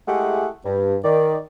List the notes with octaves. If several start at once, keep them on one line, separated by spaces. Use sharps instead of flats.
G#3 A3 E4 G4 G#4 F#5
G2
D#3 D5